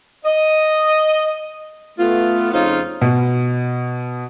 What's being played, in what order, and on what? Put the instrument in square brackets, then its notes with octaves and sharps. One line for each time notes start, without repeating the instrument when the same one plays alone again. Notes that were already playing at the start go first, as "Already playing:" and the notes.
[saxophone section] D#5
A3 B3 F4
F2 C#3 D#4 F4 C5 F5
[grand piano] B2